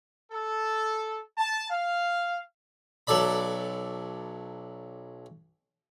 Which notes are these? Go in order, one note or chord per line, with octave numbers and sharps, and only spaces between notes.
A4
A5
F5
B1 F#3 A4 D5 B5